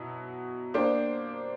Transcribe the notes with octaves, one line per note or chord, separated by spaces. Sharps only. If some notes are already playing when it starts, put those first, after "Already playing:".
Already playing: B2 F#3 E4
A#3 D4 G4 C5